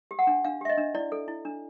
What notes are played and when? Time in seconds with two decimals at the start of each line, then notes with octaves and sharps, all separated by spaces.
0.11 G4
0.19 F#5
0.27 D4
0.45 D4 F5
0.61 G4 E5
0.69 D#5
0.77 D4
0.95 E4 D5
1.12 A4
1.28 E4
1.45 D4